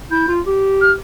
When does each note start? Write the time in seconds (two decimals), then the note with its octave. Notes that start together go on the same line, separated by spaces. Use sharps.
0.11 E4 G6
0.28 F4
0.47 G4
0.81 F6